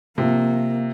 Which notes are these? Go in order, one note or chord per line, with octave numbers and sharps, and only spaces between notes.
C3 F3 A#3